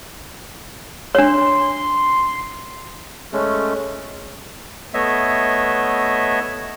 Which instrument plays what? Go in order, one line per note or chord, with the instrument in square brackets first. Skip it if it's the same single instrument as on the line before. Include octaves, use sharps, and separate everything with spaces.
[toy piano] D4 C#5 [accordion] C6
[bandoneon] G#3 A3 C#4
A3 B3 C#5 D#5 E5